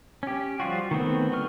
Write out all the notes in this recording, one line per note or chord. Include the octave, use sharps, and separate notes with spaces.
C#4 G4
F3 G3 F4 F#4
D#3 A3 B3 C4
D3 F#3 B4 C#6 F6